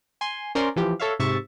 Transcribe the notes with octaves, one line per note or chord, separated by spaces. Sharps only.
G#5 C6
C#4 A#4 C5 D5 C6
E3 F3 G4
A4 C#5 E5 F5
G#2 C3 E5 C#6 A6